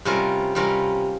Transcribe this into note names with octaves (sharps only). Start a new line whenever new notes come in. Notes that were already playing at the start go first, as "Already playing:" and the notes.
C3 G3 C#4 F4 A#4
C3 G3 C#4 F4 A#4